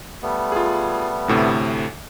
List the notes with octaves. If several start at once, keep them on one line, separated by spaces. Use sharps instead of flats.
G3 A3 B3
F4 G#4
D2 A2 C3